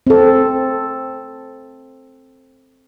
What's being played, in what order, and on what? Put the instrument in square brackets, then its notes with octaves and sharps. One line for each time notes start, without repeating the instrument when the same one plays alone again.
[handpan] C4 A4